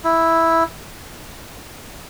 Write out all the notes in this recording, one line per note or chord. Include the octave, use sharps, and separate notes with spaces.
E4